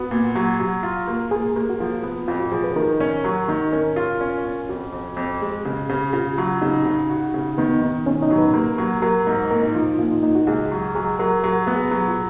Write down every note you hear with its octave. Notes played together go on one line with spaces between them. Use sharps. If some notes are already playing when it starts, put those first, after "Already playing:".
Already playing: B3 F#4
A#2
F#3
F#3
F4
A#3
A#3 G#4
A#3
F#4
F3 F4
B3
F2 F4
F#4
F3 G#4
B4
D#3 A#4
C#4
F#3
D#3
C#4 A#4
F4
C#4
C#4
F2 F#4
F2
F2
G#3
C#3
C#3
C#3 F4
F#3
C#3 D#4
C#3
F#4
C#3
D#3 B3
D#3
D#3 C#4
D#4
F#3
B4
A#3
F#3
F#3 A#4
G#2
A#2 A#4
D#4
F3 F4
A#2 F4
D#4
A#2 D#4
F#4
C#2 G#4
F#3
F#3 G#4
F#3 A#4
F#3 A#4
B3
G#4
F#3 F#4
F4